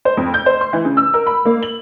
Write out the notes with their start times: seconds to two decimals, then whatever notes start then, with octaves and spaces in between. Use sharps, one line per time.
0.05 C5
0.17 F2
0.34 G6
0.46 C5
0.61 C6
0.73 E3
0.85 C#3
0.97 E6
1.14 A#4
1.27 B5
1.45 A#3
1.63 F#7